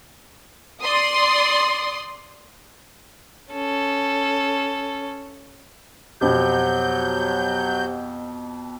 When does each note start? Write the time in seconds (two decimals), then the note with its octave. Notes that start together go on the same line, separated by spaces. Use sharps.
0.82 D5 C6 D#6
3.53 C#4 A4
6.21 F2 B2 F#3 G4 C5 G6